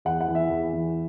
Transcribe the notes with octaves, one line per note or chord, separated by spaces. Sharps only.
E2 F#5
F#5
E3
E5
E2
E3